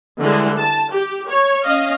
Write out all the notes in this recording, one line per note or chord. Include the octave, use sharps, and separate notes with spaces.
D3 E3 G3 G#3
A5
G4
C#5
C#4 D#5 F5